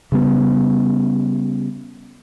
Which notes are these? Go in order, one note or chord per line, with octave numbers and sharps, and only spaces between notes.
C#3 G3 B3